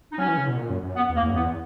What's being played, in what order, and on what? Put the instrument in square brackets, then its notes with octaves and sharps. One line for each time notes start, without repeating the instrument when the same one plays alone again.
[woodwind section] D#4
[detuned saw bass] F#3 [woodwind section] C#4
[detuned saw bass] E3
C#3
B2
A#2
F#2
F#2
[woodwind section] B3
[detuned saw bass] E2
[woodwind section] A#3
[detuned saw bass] E2
F#2
[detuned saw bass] E2 [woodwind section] B3